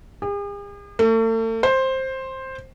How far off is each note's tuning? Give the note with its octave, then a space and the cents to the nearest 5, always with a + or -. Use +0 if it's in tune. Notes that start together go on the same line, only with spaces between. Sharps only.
G#4 -45
A3 +40
C5 +10